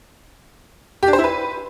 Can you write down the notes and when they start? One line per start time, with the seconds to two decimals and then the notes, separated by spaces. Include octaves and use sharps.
1.03 G4
1.08 D4
1.13 C5
1.19 E4
1.24 B4